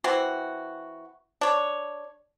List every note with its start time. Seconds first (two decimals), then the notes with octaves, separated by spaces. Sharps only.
0.04 E3 C4 F#4
1.41 D4 C#5